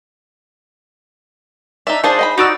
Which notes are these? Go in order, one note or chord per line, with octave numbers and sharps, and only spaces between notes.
D4 D#4 E5
F3 D4 D#4 G#4 C5
D#5 F#5 B5
D#4 F#4 D5 E6